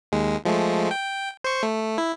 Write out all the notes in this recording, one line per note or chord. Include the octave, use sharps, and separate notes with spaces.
D#2 G#3
F3 G#3 A3
G5
C5 C#6
A3
E4